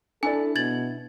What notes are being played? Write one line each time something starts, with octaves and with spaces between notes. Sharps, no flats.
D4 E4 A4 D5 G#5
B2 G#6 A6 F#7